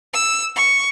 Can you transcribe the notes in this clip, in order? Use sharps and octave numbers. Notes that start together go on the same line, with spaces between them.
E6
C#6